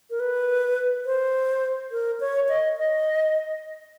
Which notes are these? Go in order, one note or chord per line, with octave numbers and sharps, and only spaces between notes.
A#4
B4
C5
A#4
C#5
D#5
D#5